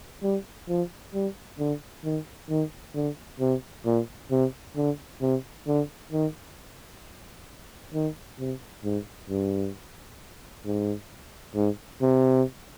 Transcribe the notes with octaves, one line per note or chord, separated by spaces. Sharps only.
G3
F3
G3
D3
D#3
D#3
D3
C3
A#2
C3
D3
C3
D3
D#3
D#3
C3
G#2
G2
G#2
G#2
C3